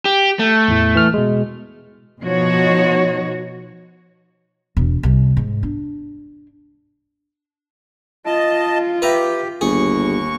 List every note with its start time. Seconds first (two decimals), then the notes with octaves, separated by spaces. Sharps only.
0.05 G4
0.39 A3
0.68 E2 A2 E3
0.95 E3 F6
1.14 B2 G#3
2.22 B2 F3 D#4 F#4 C#5
4.77 E1
5.03 C2
5.37 G#2
5.63 D4
8.26 F4 D#5 A5
9.02 G4 B4 E5 A#5
9.61 G1 D#2 G#4 C#6